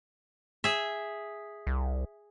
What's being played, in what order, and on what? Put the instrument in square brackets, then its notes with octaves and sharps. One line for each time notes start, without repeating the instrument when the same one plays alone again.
[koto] G#4 E5
[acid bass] C2